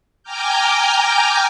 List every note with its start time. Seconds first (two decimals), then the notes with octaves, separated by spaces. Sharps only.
0.23 G5 G#5 A#5 D6 F6 G6